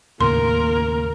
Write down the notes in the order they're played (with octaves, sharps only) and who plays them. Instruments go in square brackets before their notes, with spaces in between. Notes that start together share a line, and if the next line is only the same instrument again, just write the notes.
[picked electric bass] D#2 A2 C#3 [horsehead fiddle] A#3 A#4 [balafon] C6